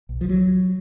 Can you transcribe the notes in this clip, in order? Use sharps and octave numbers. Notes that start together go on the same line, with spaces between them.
B1
F3
F#3